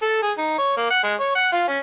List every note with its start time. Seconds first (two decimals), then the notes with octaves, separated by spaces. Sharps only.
0.02 A4
0.22 G#4
0.38 D#4
0.58 C#5
0.77 A#3
0.90 F#5
1.04 G#3
1.20 C#5
1.35 F#5
1.52 F4
1.68 C#4